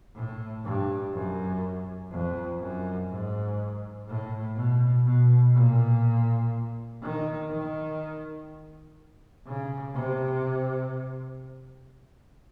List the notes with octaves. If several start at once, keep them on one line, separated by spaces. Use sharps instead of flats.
A2
G2
F#2
F2
F#2
G#2
A2
B2
B2
A#2
D#3
D#3
C#3
C3